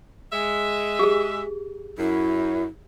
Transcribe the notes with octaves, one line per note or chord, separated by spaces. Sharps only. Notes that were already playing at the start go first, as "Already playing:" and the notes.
G#3 E5
G4 G#4
F#2 E4